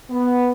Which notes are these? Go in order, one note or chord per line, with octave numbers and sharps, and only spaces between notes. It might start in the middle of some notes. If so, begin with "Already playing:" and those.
B3